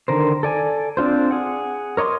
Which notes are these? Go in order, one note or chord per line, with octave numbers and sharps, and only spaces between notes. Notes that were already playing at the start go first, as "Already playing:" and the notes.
D3 D#3 A#4 C5
A4 D5 G#5
C4 D4 F4 C5
G#4 F#5
A#4 C#5 D#5 C6 D6